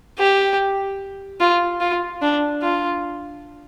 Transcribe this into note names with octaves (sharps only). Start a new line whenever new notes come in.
G4
F4
F4
D4
F4